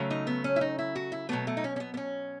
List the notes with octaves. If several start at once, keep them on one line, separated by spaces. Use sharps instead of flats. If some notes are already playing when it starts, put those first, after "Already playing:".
Already playing: C#3 F#3 A3
D#4
B3
C#4
E4
D#4
E4
F#4
E4
B2 F#3 A3 B3
A3
D#4
C#4
C#4
B3
B3
C#4